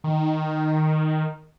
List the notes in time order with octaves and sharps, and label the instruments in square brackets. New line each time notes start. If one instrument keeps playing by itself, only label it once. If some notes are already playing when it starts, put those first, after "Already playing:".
[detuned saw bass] D#3